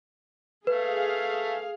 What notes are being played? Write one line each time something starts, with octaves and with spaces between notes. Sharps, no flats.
A3 G#4 B4 F5